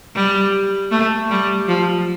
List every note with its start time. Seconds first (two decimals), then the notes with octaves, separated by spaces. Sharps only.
0.16 G3
0.91 A3
1.30 G3
1.68 F3